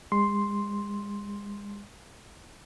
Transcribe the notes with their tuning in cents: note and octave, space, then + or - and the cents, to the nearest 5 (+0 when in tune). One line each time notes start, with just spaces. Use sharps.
G#3 -40 C6 +0